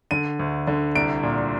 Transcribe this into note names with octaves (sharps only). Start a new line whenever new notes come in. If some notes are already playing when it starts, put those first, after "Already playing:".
D3 D#7
D2
D3
C2 D7
A#2